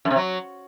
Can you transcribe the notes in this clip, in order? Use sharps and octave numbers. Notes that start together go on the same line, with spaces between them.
F#2
C3
F#3